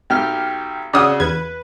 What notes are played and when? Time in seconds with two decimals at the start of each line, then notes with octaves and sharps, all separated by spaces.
0.10 B1 G4 F6
0.93 C#3 C#4 F#4 D5 D#6 E6
1.20 E2 B4 G#6